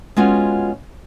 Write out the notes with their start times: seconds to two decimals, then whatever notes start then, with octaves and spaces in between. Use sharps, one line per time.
0.17 G#3 B3 C#4 F4 F#4 G#5